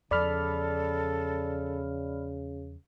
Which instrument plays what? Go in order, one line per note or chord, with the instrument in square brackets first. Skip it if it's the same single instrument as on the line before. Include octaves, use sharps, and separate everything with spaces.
[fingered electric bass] E2 F3 [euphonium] C#3 [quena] A4 [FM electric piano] D5 B5 F6